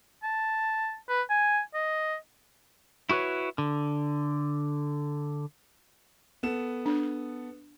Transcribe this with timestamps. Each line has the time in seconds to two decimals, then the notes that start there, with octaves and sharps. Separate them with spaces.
0.23 A5
1.09 B4
1.30 G#5
1.74 D#5
3.10 E4 F#4 G4 B4 C#5
3.58 D3
6.43 B3 A4 E7
6.86 D4